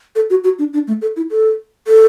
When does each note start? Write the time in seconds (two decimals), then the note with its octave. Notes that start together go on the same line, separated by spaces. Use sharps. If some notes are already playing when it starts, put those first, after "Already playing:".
0.16 A4
0.30 F#4
0.44 F#4
0.59 D4
0.73 D4
0.88 A3
1.02 A4
1.16 E4
1.31 A4
1.88 A4